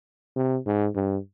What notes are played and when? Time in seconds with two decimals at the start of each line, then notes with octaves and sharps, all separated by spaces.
0.36 C3
0.67 G#2
0.96 G2